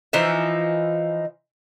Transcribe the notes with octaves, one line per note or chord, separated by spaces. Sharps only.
E3 F3 D#4 E5